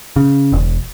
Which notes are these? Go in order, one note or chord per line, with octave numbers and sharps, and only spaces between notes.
C#3
E1